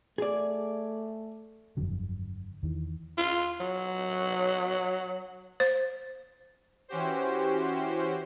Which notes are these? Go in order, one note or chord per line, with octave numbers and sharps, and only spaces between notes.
A3 G#4 D5
G1 F2 D3 F#3
E2 D#3 E3
F4
F#3
C5
E3 C#4 F#4 G4 C5